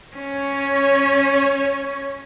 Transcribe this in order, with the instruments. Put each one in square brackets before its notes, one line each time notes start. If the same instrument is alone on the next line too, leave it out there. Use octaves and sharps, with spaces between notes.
[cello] C#4 C#5